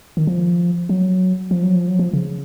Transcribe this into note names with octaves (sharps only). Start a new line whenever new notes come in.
D#3
F3
F#3
F3
F#3
F3
F#3
F3
C#3